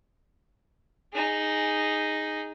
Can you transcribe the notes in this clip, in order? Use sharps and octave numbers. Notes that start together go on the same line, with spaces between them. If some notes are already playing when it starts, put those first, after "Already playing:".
D#4 G#4